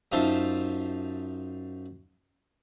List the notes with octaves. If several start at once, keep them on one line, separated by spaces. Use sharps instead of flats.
F#2 D#4 F4 C5 E5 A5